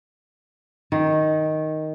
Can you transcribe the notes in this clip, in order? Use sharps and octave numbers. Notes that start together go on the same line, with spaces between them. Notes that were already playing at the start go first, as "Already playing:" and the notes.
D#3